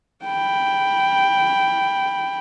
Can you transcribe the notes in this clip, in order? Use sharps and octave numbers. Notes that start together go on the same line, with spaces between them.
G5 B5